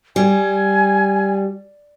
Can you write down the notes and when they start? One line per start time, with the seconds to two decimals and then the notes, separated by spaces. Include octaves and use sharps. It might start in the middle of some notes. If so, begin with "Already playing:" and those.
0.16 G3 G#5